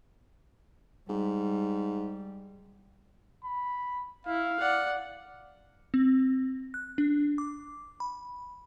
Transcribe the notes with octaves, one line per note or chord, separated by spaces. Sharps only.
G#2 G3
B5
E4 F5
D5 F#5
C4
F#6
D4
D6
B5